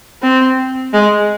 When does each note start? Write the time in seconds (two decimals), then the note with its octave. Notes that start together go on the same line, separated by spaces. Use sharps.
0.22 C4
0.93 G#3